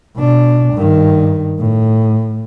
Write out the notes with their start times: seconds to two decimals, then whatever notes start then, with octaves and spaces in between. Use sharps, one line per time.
0.16 B2 D4
0.74 G2 D#3
1.59 A2